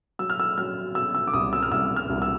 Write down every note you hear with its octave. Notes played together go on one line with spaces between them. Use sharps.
F#3 E6
F6
E6
F#3 F6
B2 E6
E6
D6
C2 D#6
E6
F6
C2 E6
F6
C2
E6